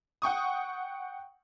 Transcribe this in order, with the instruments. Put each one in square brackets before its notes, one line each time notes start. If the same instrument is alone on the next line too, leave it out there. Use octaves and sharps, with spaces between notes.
[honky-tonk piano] F#5 G5 C#6 D#6